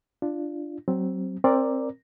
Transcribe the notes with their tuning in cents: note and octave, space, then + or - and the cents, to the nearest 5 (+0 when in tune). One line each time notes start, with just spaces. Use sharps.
D4 +10 F4 -20
F#3 +25 C4 +0
C4 +20 A#4 +0 D5 +0